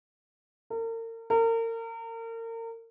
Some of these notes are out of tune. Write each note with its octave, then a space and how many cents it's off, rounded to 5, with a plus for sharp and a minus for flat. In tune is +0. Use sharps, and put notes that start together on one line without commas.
A#4 -40
A#4 -35